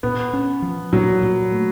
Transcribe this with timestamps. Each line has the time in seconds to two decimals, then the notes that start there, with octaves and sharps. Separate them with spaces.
0.03 A#2 B3
0.33 C#4
0.62 F3
0.93 A#2 F#3
1.23 A#2
1.52 A3